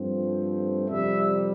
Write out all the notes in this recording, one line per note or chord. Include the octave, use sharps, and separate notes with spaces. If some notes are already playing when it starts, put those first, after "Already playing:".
Already playing: G2 F3 A3 C4
F2 C3 G3 E5